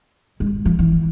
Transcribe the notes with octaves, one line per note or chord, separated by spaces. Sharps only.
G#3
F3
E3